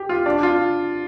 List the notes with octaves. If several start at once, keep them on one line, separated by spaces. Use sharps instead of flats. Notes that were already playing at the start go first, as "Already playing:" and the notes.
Already playing: G4
F4
D4
F4